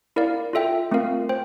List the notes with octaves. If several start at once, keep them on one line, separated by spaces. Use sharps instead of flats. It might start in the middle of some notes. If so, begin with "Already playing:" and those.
E4 A#4 D5 F5
F4 A4 E5 G5
A3 C4 F4 A#4 F5
C5 G5